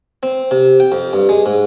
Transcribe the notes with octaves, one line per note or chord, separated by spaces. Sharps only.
C4
C3
G5
F2
G2
G#3
G#2